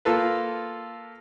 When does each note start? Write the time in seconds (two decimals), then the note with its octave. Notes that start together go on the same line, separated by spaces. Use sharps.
0.05 A#3 F4 A4 B4